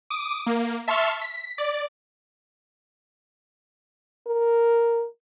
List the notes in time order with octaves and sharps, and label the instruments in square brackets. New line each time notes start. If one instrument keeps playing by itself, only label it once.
[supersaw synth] D6 D#6
A#3
E5 A5 C6 C#6 F6
B6
D5
[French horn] A#4